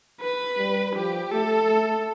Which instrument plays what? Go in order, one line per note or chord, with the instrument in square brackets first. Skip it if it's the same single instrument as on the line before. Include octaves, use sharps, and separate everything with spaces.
[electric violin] B4
[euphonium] G3
[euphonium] F3 [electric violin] G4
[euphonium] A3 [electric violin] A4
[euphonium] A3